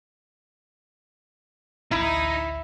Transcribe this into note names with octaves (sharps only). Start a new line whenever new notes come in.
A1 D2 D#4 E4